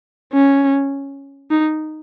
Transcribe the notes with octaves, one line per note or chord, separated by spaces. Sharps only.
C#4
D#4